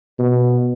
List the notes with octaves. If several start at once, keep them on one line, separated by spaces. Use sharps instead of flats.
B2